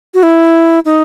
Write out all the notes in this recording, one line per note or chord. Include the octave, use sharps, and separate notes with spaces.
F#4
E4
D#4